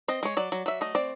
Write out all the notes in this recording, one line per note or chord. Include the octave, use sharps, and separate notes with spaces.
C4 D#5
G#3 C#5
F#3 D5
F#3
F#3 E5
A3 D#5
C4 D5